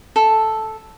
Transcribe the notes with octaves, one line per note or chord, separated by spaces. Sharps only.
A4